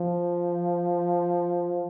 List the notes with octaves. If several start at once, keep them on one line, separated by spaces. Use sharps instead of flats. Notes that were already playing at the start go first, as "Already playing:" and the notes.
Already playing: F3